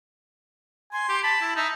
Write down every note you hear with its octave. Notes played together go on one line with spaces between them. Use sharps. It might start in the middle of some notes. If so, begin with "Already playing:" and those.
G#5 C6
G4
A5 B5
E4
D#4 E5